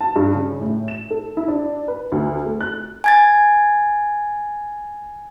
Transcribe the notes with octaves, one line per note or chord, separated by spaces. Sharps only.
A5
G2
C#3
A2
E7
A4
E4
D4
B4
D2
A3
F#6
G#5 G#6 A6